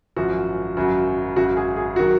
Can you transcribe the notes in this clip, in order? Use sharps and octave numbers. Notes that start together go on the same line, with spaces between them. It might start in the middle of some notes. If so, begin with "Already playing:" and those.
G#1 F#2 F3 F#4
G#1 F#2 C#3 F#3 F#4
G#1 F#2 C#3 F#4
G#4
G#4
D#3 F#3 F#4